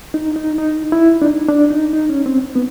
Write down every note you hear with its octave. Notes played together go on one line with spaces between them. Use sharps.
D#4
D#4
D#4
E4
D4
D#4
D4
D#4
D#4
C#4
C4
B3